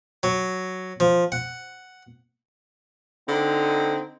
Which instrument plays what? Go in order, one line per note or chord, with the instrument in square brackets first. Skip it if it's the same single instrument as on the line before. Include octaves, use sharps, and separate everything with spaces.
[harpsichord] F#3
F3
F#5
[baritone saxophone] D3 [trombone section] C4 D#4